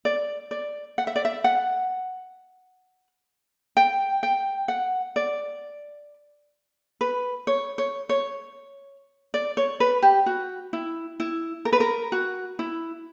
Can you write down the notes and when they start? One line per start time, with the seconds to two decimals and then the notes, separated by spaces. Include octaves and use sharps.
0.05 D5
0.51 D5
0.98 F#5
1.07 E5
1.16 D5
1.25 E5
1.44 F#5
3.77 G5
4.23 G5
4.68 F#5
5.16 D5
7.01 B4
7.47 C#5
7.78 C#5
8.09 C#5
9.34 D5
9.57 C#5
9.80 B4
10.02 G4
10.26 F#4
10.73 E4
11.20 E4
11.65 A#4
11.73 B4
11.80 A#4
12.12 F#4
12.59 E4